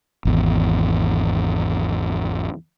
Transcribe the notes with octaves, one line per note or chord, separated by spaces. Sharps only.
G#1 E2